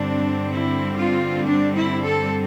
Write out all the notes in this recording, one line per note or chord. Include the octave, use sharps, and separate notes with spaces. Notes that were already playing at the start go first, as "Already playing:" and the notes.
Already playing: G2 D3 G3 C4 D4
E4
F4
D4
E4
A4